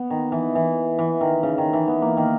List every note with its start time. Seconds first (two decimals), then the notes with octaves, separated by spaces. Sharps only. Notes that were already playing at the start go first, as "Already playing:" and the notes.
Already playing: B3
0.10 D#3
0.32 E3
0.55 E3
0.99 E3
1.21 D#3
1.43 C#3
1.58 D#3
1.73 E3
1.88 B3
2.02 A#3
2.17 D#3